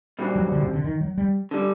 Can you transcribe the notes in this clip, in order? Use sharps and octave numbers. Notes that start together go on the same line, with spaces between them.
A#2 G3 D4 F#4 C5
F#3
D3
C3
D3
D#3
F#3
G3
D3 G3